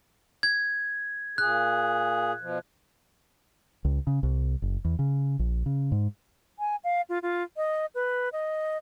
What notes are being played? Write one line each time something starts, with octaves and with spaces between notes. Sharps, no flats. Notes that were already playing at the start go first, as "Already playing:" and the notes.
G#6
A#2 G#4 F#6
B2 F3
C#2
C#3
C2
F#1
E2
C#3
A#1
C#3
G#2
G#5
F5
F4
F4
D#5
B4
D#5